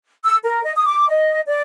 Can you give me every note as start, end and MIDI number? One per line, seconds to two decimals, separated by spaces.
0.24 0.36 88
0.43 0.61 70
0.63 0.72 75
0.75 0.84 87
0.87 1.05 86
1.09 1.40 75
1.47 1.62 74